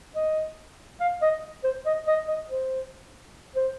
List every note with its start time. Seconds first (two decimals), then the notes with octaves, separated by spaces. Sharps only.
0.15 D#5
1.00 F5
1.22 D#5
1.64 C5
1.86 D#5
2.07 D#5
2.28 D#5
2.50 C5
3.56 C5